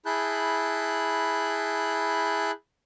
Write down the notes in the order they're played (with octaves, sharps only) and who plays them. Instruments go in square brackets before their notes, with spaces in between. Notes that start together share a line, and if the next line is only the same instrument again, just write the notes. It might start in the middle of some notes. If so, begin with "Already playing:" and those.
[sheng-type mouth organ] E4 G#4 A5 B5 F#6 G6